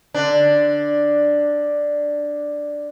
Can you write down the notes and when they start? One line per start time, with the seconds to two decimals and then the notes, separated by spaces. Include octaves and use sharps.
0.14 D3 D4